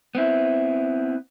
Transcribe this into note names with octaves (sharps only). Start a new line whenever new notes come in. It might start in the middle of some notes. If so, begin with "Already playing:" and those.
B3 C4 E4